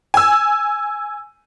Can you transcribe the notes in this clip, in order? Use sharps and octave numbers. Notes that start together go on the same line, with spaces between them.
G#5 E6